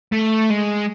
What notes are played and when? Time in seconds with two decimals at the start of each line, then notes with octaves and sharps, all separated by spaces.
0.12 A3
0.50 G#3